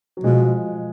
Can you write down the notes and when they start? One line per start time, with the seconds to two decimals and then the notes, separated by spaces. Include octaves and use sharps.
0.17 F#3
0.24 B2 F3 G#3